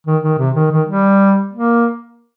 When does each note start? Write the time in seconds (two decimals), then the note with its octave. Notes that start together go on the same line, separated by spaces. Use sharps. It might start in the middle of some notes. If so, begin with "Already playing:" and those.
0.07 D#3
0.23 D#3
0.38 C3
0.55 D#3
0.71 D#3
0.87 G3
1.53 A#3